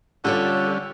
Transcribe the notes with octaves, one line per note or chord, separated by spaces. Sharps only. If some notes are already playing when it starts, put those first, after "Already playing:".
D3 G3 C#4 F4 A4 C#5